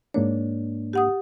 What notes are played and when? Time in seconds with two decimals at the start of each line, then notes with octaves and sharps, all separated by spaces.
0.14 G#2 A#3 D4 C#5
0.93 G4 F#5 D#6